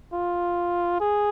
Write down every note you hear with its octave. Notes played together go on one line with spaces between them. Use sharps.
F4
G#4